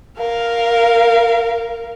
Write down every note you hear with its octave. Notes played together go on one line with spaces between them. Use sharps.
A#4 F5